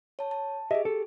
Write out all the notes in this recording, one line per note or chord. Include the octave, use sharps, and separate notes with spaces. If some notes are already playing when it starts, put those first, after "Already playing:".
C#5 A5
A5
G4 G#4 D#5 E5
A4